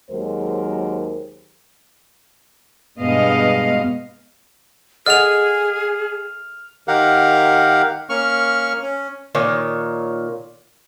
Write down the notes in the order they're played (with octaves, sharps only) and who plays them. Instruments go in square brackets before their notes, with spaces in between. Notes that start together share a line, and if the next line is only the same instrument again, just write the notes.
[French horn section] D#2 F#3 G#3 A#4 C5
[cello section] G2 B2 G#3 B3 D#5 F5
[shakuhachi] G#4 [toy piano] A4 D#5 F#5 [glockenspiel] F6 F7
[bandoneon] D#3 G4 A#4 F5 F#5
A#3 C#4 C#6 F6
C#4
[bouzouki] A#2 D#3 C#5